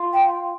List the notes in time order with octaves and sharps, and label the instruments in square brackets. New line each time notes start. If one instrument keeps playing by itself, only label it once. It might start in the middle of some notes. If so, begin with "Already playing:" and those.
Already playing: [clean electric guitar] F4
[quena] G5